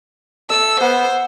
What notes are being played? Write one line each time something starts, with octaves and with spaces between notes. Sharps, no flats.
A4 E5 E6
B3 C5 F#5